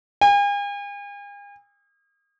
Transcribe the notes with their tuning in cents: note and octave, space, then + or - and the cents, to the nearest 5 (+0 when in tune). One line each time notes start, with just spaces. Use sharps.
G#5 -45